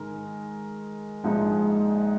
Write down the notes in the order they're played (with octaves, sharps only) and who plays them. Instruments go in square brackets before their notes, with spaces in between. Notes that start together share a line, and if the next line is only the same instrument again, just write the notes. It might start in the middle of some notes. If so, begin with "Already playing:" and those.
Already playing: [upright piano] G#2 D#3 G#3 A#4
A#1 G#2 F3 G#3 D#4